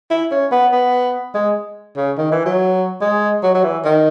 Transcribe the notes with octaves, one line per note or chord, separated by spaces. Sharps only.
E4
C#4
B3
B3
G#3
C#3
D#3
E3
F#3
G#3
F#3
F#3
E3
D#3